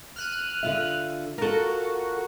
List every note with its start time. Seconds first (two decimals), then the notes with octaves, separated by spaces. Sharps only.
0.16 F6 F#6 D#7
0.63 D3 F4 E5
1.38 F4 F#4 A4 A#4